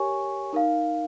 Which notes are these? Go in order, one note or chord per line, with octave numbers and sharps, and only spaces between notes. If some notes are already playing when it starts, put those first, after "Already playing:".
Already playing: G4 A#4 C#5 G#5 C#6
D#4 A#4 F5